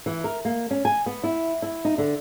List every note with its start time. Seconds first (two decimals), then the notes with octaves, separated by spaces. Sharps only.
0.06 E3
0.24 A#4
0.45 A#3
0.71 C#4
0.85 G#5
1.06 B3
1.24 E4
1.62 E4
1.85 D#4
1.98 D3